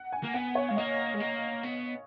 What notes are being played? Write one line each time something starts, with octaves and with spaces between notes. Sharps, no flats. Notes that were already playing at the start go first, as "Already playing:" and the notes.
Already playing: F#5
G#5
A#3
B3 F#5
C#5
G#3 F5
A#3 D#5
G#3
A#3
B3